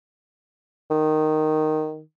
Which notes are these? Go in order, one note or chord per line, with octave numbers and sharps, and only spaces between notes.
D#3